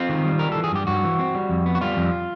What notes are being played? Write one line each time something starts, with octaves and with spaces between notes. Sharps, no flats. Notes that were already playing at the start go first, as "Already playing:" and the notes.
Already playing: C4 F4
D#3
G3
G3 A#4
E3 A4
G#4
G2 G4
G2 F#4
E3
C4
G3
F2
B3
F#4
G3 F4
F2